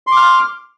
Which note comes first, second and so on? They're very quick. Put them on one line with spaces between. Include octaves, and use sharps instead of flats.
C6 D6 F6